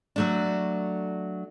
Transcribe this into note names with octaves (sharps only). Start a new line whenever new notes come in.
F#3 A3 D4